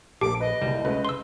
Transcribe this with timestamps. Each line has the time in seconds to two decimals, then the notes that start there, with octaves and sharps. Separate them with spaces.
0.21 A#1 A#3 G4 A4 D6
0.41 B4 D#5
0.62 F#1 C2 G3
0.85 C#2 C#3 A3 B4
1.05 C6 E6